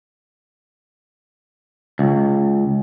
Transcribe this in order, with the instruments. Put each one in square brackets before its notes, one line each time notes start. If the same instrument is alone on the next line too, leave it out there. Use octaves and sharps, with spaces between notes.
[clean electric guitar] C#2